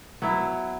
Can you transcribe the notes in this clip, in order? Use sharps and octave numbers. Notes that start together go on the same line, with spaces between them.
F#3 B3 E4